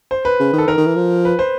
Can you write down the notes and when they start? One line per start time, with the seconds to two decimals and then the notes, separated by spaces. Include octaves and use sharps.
0.11 C5
0.25 B4
0.40 C#3
0.53 D#3
0.58 A4
0.67 D#3 A#4
0.78 D#3
0.86 E3
0.96 F3
1.25 B4
1.39 C5